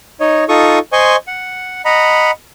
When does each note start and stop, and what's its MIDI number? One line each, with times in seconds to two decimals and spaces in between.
0.20 0.44 63
0.20 0.44 73
0.20 0.44 75
0.49 0.79 63
0.49 0.79 65
0.49 0.79 69
0.49 0.79 85
0.49 0.79 87
0.93 1.16 72
0.93 1.16 75
0.93 1.16 80
0.93 1.16 84
0.93 1.16 85
1.27 1.82 78
1.85 2.31 75
1.85 2.31 78
1.85 2.31 82
1.85 2.31 83